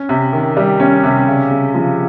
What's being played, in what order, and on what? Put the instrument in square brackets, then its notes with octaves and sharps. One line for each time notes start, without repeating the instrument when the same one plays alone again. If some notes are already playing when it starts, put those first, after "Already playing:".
Already playing: [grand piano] C#4
C3
D#3
G3
C#4
C3
C#3
C#3
F3